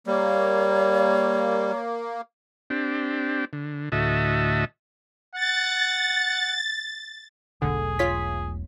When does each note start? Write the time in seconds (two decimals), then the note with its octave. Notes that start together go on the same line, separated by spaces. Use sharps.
0.07 G3 A#3 C#5
2.70 C4 D4 G4
3.53 D3
3.92 D2 A2 F#4 D#5 E5 A5
5.35 F#5 A6
7.62 E1 B1 D3 A3 G#4
7.99 F4 C#5 B6